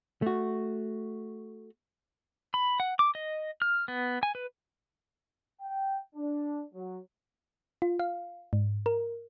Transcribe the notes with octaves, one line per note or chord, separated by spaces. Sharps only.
A3 F#4
B5
F#5
D6
D#5
F6
B3
G#5
B4
G5
D4
F#3
F4
F5
G#2
A#4